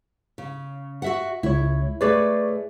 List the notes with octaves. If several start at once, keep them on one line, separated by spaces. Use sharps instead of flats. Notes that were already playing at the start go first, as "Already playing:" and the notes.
C#3
F#4 E5 F#5
C#2 E4 C#5
A3 G#4 B4 C#5 D5